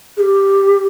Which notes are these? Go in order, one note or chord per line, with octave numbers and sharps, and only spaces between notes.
G#4
G4